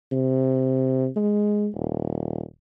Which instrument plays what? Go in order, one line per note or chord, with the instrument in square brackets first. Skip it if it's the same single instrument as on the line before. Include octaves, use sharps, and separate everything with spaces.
[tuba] C3
G#3
D#1